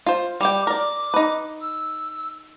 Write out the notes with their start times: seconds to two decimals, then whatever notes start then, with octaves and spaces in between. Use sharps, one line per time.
0.06 F4 C5
0.41 G3 G5 D6
0.67 A#4 D5 D6
1.14 D#4 B4
1.61 E6